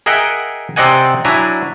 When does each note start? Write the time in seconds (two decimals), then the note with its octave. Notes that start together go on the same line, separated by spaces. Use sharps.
0.06 G#4 A#4 D#5 E5 F#5 G5
0.76 C3 C4 D5 D#5 F#5 G#5
1.25 F#3 D4 E4 G#5 A#5